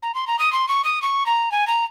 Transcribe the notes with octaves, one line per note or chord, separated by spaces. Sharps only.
A#5
C6
A#5
D#6
C6
C#6
D#6
C#6
A#5
G#5
A#5